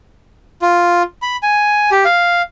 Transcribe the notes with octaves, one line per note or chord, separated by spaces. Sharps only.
F4
B5
G#5
G4
F5